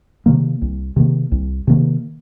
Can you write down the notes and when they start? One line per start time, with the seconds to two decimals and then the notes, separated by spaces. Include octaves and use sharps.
0.26 C3 D#3 A#3
0.62 C2
0.96 C3 D#3 A#3
1.32 C2
1.67 C3 D#3 A#3